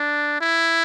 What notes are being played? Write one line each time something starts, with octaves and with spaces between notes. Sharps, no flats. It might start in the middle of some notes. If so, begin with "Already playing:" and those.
Already playing: D4
E4